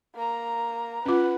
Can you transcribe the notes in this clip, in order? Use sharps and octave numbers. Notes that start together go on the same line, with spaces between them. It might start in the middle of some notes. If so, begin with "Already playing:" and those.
A#3 A#5
C#4 F4 B4 F#5